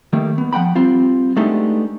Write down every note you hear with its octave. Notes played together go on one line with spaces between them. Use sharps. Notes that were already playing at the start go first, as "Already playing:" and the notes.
D#3 G3 A3 A#3
B3
F3 F#5 G5 B5
G3 C4 F4
G#3 A3 B3 D4 D#4 G4